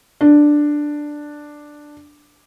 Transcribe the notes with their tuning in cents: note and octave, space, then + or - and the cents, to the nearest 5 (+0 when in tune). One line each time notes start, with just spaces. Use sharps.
D4 +5